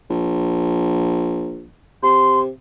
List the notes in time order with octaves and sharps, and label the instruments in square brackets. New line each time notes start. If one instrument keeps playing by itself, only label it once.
[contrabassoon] A#1
[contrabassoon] C3 [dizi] C6